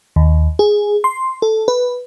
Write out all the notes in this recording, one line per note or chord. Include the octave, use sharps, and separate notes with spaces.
D#2
G#4
C6
A4
B4